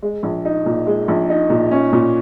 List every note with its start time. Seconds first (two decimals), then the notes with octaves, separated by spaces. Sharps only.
0.02 G#3
0.23 A#1
0.45 D#4
0.66 A#2
0.87 G#3
1.08 A#1
1.30 D#4
1.50 A#2
1.71 C#4
1.93 A#2